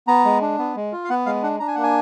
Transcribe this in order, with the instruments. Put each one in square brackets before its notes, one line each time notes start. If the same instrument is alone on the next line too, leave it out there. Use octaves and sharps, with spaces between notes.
[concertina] B3 A#5
G#3
D4
B3
G#3
F4
F5
B3 F#5
G#3 F5
D4 F#5
D4 A#5
G#5
A#3 F#5
G#5